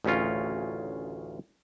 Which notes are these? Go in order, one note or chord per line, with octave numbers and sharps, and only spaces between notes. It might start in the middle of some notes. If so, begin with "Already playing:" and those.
A1 D2 C#3 C#4 F4